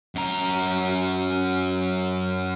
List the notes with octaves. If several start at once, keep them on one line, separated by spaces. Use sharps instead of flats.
F#2 A#5